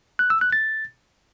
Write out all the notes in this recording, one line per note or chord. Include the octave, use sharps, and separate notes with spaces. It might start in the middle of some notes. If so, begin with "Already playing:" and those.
F#6
E6
F#6
A6